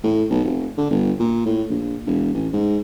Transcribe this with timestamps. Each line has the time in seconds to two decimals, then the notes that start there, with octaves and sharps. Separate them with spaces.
0.04 A2
0.30 B1
0.44 F1
0.77 D3
0.90 G1
1.19 A#2
1.46 A2
1.70 A#1
2.06 E1
2.33 A1
2.53 G#2